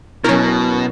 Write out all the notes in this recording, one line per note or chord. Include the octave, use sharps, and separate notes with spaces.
B2 F#3 C#4 E4 A#4